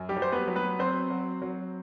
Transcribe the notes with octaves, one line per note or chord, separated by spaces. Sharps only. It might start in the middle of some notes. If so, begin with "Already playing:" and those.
Already playing: F#2
G3 G4
F#3
C5
B3 B4
F#3
B3 B4
F#3 C4 C5
F#3
F#3